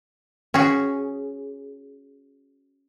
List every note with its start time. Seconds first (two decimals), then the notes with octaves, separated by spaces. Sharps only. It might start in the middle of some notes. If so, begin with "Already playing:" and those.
0.54 C#4 F#4 G#4